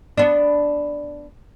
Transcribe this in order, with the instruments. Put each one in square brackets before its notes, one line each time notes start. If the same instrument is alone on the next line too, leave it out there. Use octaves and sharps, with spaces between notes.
[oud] B3 D4